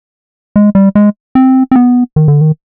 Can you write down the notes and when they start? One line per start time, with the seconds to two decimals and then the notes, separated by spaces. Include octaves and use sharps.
0.56 G#3
0.75 G3
0.95 G#3
1.35 C4
1.71 C4
1.76 B3
2.16 D#3
2.28 D3
2.41 D#3